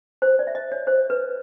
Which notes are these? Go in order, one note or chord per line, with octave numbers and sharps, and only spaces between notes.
C5
D5
E5
D#5
C#5
C5
B4